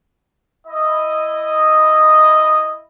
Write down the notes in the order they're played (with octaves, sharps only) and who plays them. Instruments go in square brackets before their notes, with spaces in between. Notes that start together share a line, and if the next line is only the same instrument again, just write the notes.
[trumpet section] E4 D#5